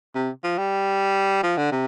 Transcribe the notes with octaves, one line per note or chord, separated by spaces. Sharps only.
C3
F3
G3
F3
D3
C3